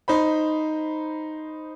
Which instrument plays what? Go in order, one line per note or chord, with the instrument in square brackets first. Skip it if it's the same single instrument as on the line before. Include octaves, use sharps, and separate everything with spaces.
[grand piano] D#4 C5 B5